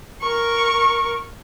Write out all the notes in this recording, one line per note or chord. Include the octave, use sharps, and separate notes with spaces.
A#4 C#6